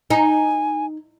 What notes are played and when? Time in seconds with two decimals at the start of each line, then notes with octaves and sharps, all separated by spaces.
0.10 D#4 G#5